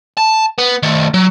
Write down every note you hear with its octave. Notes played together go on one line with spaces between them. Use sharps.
A5
B3
D#3 A3
F#3